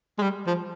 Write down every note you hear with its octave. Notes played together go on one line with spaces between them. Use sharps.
G#3
G3
F3